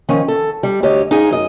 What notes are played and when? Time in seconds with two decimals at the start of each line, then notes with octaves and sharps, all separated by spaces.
0.09 D#3 F3 C#4
0.28 A4
0.63 G3
0.83 D2 G4 C#5 D#5
1.11 D#4 G#4 F5
1.31 F#2 D#5